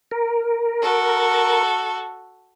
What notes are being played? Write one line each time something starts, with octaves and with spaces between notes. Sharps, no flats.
A#4
F#4 A4